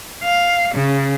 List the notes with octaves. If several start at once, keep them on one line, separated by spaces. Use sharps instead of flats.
F5
C#3